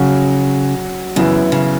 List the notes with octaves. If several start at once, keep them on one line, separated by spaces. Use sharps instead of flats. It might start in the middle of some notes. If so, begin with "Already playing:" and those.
Already playing: C#3 F#3 C#4 F#4
F#2 C#3 E3 B3 E4
C#3